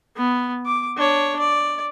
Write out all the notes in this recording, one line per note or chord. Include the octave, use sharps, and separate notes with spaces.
B3
D6
D4 C#5
D5